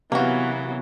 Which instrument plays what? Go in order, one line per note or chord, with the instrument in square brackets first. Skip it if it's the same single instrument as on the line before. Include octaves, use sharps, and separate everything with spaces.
[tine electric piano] C3 [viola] E3 F#3 [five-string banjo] A#3 F#4 [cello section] B3 C#4